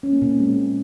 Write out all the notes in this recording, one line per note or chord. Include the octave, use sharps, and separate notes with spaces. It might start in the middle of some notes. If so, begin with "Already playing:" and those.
C#4
A#3
A#2
C4
G#3